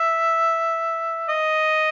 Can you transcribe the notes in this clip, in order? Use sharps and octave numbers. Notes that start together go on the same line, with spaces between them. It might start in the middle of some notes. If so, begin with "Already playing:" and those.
Already playing: E5
D#5